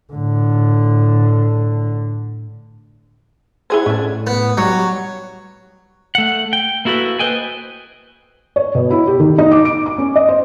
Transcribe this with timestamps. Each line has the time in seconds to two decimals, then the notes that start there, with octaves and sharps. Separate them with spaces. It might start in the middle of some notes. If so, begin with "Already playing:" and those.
0.14 A2 D3
3.70 E4 G#4 C5 F#5 G#6
3.86 A2 C#4 D4
4.27 B3
4.57 F#3 G3 D#4 C#5
6.15 A3 F#5
6.53 G5
6.85 A#3 E4 F#4 A4 B4
7.19 B4 C5 D#5 G5 G#5
8.56 C#5
8.75 B2
8.90 E4
9.07 G4
9.20 D#3
9.38 D#4
9.51 D6
9.65 D7
9.86 D6
9.98 C#4
10.16 D#5
10.29 C5